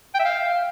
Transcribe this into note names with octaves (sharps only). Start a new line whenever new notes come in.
G5
E5
F5